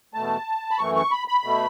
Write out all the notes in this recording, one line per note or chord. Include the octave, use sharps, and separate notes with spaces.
E2 B2 A3 A5
B5
F#2 E3 A3 C#6
C#6
B5
B5
B2 A3